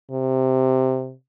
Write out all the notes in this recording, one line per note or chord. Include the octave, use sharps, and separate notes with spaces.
C3